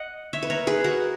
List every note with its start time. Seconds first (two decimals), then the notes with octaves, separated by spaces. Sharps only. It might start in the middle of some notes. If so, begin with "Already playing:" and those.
Already playing: D#5 F#5
0.33 C#5 E5
0.43 B4
0.50 A#4 C#5
0.67 G#4 B4
0.84 F#4 A#4